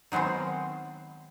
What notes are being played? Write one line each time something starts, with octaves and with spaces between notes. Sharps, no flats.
D#3 F#3 G#3 B3 C4